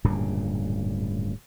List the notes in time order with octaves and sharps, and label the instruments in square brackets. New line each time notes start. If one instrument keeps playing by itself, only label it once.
[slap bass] D1 G2 A#2 C#3